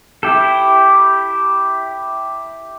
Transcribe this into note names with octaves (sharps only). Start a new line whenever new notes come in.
E4 G4 A4